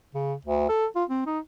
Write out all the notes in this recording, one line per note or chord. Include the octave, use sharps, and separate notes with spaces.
C#3
D2
A4
F4
C4
D#4